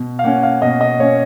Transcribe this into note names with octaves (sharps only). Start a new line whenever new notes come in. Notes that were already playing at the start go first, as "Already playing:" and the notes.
Already playing: B2
F5
A#3 C#4 F#5
F5
B2 D#5
D#5
A#3 C#4 C#5